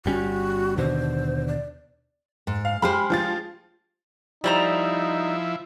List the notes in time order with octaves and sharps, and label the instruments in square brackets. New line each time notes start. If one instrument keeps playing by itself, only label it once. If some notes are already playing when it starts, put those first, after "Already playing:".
[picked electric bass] G1 G3 C#4 [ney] F#4
[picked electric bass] D#2 B2 D3 [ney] C5
[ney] D5
[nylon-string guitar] G#2
[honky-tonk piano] F5
[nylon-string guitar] G#3 G4 C5 [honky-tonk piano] B5 F6
[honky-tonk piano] F3 F4 A6
[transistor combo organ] F3 E4 [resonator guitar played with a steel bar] G3 C5 A#5 [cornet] D#4